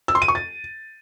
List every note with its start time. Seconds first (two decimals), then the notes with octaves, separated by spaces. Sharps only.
0.08 E6
0.15 C6
0.22 D#7
0.28 C#6
0.35 A6